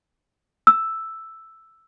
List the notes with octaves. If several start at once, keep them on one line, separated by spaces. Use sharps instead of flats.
E6